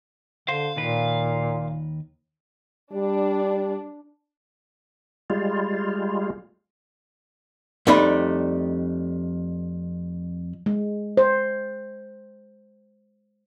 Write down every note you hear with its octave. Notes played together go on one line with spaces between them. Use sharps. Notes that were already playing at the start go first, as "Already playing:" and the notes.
D3 C5 F5
D#2 A#2 D#3 B4
G3 D4
G3 G#3 F4
F2 G3 A3 D4 D#4 B5
G#3
C5